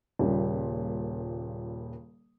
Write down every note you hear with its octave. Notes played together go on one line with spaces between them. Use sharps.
D#1 A#2 C#3 G3